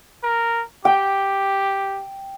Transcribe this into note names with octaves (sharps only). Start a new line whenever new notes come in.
A#4
G4 G5